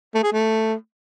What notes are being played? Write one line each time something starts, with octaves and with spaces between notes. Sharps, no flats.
A3
G#4
A3